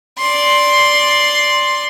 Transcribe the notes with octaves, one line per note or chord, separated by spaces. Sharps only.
D5 C6